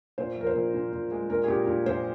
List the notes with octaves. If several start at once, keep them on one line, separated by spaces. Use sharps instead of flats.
A#2 C5
F3 A#4
C5
A#2
A#2
A#2
G#3
A#2 A#4
G#4
A#2 G4
A#2
A#2 C5